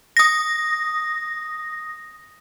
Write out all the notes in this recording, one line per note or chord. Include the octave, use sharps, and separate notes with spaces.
D#6 A#6